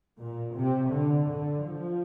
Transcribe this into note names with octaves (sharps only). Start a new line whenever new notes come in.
A#2
C3
D3
D3
F3